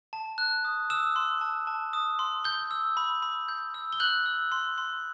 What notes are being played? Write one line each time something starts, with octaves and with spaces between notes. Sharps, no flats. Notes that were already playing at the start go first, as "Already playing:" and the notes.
A5
F#6
D#6
D#6 E6 E7
C6
A5
A5
D#6
C6
G6 G7
E6
B5
B5
G6
E6
G7
F#6 G6 F#7
E6
C6
C6